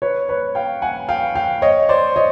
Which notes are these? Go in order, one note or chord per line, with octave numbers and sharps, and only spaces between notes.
B4 C#5
B4 C#5
F5 G5
F#5 G#5
F5 G5
F5 G5
C#5 D#5
C5 D5
C#5 D#5